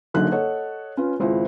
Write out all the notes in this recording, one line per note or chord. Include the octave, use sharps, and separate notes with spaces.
F#1 F#2 D3 D#4 F#6
A4 C#5 D#5 F#5
C#4 F4 B4
G#1 C#2 E4 C5